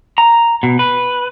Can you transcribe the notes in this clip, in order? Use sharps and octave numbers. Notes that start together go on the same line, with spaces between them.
A#5
B2
B4